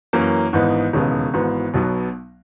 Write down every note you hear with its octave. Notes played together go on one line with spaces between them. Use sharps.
F#2 E3 A#3 C#4
G#1 G#2 E3 B3 D#4
E1 D#2 C#3 G#3 B3
G#1 G#2 E3 B3 F#4
B1 B2 F#3 B3